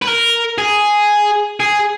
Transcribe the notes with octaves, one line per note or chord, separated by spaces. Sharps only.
B4
A#4
G#4
G#4